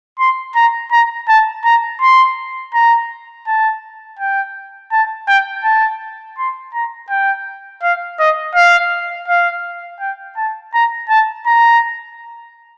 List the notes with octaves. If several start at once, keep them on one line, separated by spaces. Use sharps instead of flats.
C6
A#5
A#5
A5
A#5
C6
A#5
A5
G5
A5
G5
A5
C6
A#5
G5
F5
D#5
F5
F5
G5
A5
A#5
A5
A#5